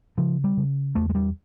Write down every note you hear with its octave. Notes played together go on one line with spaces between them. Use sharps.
C#3 F3
G3
C#3
E2 A3
G#3
G3